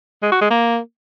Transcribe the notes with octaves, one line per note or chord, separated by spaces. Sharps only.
G#3
F#4
G#3
A#3